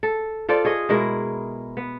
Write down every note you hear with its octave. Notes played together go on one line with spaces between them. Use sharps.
A4
F4 A4 C5 D5
G#4 C#5 D#5
B2 G#3 E4 A#4
B3